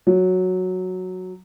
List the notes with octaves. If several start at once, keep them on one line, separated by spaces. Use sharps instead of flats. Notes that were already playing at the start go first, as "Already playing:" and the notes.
F#3